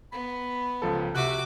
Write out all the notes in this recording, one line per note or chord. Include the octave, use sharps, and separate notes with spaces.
B3 B5
C#2 F3 A4
C3 F#4 E5 D6 F#6